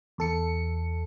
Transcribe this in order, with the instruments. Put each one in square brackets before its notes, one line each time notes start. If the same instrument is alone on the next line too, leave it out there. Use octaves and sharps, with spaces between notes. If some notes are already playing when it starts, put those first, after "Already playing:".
[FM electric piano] E2 A4 C#7